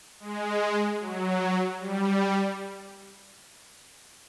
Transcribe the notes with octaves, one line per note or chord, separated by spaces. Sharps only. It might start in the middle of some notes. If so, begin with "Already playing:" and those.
G#3
F#3
G3